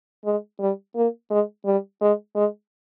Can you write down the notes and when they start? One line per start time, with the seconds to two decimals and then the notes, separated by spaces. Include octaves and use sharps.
0.25 G#3
0.60 G3
0.96 A#3
1.30 G#3
1.66 G3
2.01 G#3
2.35 G#3